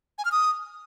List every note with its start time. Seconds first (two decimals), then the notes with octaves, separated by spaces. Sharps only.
0.18 G#5
0.25 F6
0.32 D#6